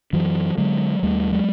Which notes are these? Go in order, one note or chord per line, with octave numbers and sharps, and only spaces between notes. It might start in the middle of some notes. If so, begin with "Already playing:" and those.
F#2 E3 F#3
D3 F#3 G#3
D#2 G3 A3
F#3 G#3